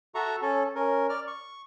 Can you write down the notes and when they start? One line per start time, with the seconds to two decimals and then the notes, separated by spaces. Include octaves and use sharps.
0.15 F#4 A4 E5 A#5 C#6
0.42 C#4 A4
0.75 C#4 A#4
1.09 D5 F6
1.27 C#6